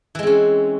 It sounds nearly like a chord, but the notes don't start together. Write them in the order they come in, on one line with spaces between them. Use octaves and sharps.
E3 G#3 C4 C#4